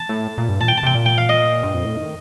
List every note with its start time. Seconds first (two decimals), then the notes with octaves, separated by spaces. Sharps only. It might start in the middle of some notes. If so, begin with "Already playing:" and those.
Already playing: A5
0.09 A2
0.38 A#2
0.49 G2
0.60 A#2 A5
0.68 G5
0.78 A5
0.83 C3 G5
0.95 A#2
1.06 G5
1.18 F5
1.29 D#5
1.63 G2
1.74 F2
1.85 A2
1.97 D#3